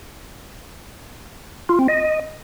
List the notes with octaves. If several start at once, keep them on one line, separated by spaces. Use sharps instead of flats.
F4
C4
D#5